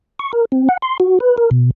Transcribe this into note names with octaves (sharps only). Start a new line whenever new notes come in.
C#6
A#4
C4
F#5
C6
F#4
B4
A#4
B2